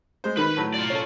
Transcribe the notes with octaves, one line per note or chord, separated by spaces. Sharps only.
G#3 C5
D#3 B4 B5
A2 F#3
F4 D5
C#4 A4